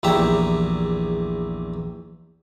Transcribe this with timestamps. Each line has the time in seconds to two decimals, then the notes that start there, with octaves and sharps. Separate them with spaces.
0.03 A#1 E2 G4 E5 A#5